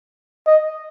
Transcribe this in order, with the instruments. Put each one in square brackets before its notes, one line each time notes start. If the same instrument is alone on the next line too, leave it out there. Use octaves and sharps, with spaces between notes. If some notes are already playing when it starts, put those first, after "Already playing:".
[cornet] D#5